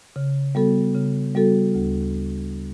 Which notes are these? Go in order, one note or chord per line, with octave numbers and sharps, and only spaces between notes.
C#3
G3 B3 F#4 A4
C#3
G3 B3 F#4 A4
D2